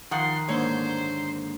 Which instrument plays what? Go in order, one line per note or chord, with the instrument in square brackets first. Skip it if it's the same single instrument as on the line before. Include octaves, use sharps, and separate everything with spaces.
[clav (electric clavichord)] D#3 [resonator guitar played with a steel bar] F3 F#5 [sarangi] C6
[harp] G#2 D3 A#3 [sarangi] C5 [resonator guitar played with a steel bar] C#5